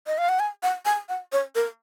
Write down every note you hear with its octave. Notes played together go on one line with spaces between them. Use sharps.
D#5
F5
F#5
G#5
F#5
G#5
F#5
C#5
A#4